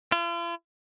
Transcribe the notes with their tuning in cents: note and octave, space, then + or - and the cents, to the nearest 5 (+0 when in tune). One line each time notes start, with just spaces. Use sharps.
F4 -45